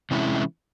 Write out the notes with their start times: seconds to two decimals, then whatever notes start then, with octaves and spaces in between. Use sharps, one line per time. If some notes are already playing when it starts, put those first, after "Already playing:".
0.11 C3 E3 G#3 C#4 E4